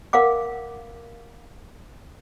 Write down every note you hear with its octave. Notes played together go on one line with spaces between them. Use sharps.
A#4 F5 F#5 D6